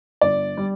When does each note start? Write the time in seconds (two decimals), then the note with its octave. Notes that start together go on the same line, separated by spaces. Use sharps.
0.21 G1 D5
0.57 G3